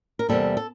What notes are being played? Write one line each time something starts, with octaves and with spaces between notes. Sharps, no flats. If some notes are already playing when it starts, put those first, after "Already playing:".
A#4
E2 C3 D#3 G3 A#3 A4
A4